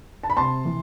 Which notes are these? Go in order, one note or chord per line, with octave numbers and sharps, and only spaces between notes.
A5
B5
C3 A5 C6
E3